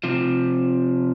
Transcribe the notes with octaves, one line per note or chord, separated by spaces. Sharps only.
C3 F3